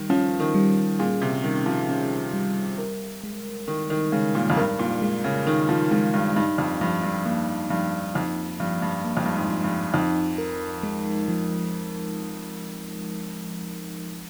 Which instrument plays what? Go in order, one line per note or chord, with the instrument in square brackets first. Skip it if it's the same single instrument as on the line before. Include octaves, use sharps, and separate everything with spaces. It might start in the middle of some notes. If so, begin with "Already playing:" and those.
Already playing: [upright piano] D#3 [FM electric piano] G3
[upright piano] F3 [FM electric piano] C#4
[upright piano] D#3
[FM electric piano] G3
[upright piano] A#2 [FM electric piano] G#4
[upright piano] C3
[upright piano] D#3 [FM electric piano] G3
[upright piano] F3
[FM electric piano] C#4
G3
A#4
G#3
[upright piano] D#3 [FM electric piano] D#4
[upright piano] D#3
[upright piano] C#3 [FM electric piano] G#3
[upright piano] A#2
F2
[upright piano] G2 [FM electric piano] A#4
[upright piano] A#2
[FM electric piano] G#3
[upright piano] C#3
[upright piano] D#3 [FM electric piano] D#4
[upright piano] F3
[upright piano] F3 [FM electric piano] G#3
[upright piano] G2
[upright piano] G2 [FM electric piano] D#4
[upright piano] F2
[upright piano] G2 [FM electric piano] F3
[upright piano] G2
[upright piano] G2 [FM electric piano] A#3
[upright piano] G2 [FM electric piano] F3
[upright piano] F2 [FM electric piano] D#4
[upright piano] G2 [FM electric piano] F3
[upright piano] G2
[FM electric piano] A#3
[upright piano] F2
G2
G#2
[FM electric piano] F3
[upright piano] G2
[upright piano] F2 [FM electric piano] D#4
[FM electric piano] A#4
G#3
F3